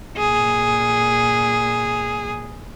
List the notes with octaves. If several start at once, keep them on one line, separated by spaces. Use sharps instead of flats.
A#2 G#4